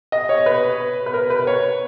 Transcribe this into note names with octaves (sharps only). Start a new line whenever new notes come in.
D#5
C#5
B4
B4
A#4
B4
C#5